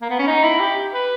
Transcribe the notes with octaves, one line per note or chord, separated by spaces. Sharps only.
A#3
B3
C#4
D#4
E4
G4
B4